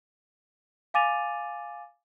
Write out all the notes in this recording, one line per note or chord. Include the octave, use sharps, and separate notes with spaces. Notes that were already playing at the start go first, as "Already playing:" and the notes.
F5 G#5 D6 A6 D#7 F7